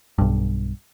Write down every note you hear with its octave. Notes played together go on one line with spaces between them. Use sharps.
B1 G2